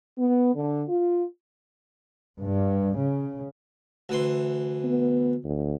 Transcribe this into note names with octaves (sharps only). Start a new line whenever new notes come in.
B3
D3
F4
G2
C#3
D2 E3 C6
B3
D2